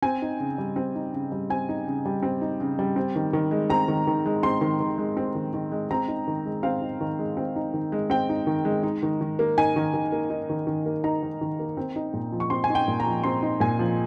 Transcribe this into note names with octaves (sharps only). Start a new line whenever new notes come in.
C4 G#5
D#4
C#3
G3
C4
D#4
C#3
G3
C4 G#5
D#4
C#3
G3
C4
D#4
C#3
G3
C4
D#3
D#3
G#3
C4 A#5
D#3
D#3
G#3
C4 C6
D#3
D#3
G#3
C4
D#3
D#3
G#3
C4 A#5
D#4
D#3
G#3
C4 F5
D#4
D#3
G#3
C4
D#4
D#3
G#3
C4 G5
D#4
D#3
G#3
D#4
D#3
D#3
A#3
D#4 G#5
D#3
D#3
A#3
D#4
D#3
D#3
A#3
D#4 A#5
D#3
D#3
A#3
C4
D#4
A#2
F3
C#6
C4 C6
G#5
D#4
G5
A#2
A#5
F3
C4 C6
D#4
A#2 G#5
F3